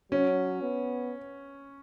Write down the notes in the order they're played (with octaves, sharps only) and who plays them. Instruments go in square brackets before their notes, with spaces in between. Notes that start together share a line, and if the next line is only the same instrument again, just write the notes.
[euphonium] F#3 [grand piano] C#4
[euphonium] B3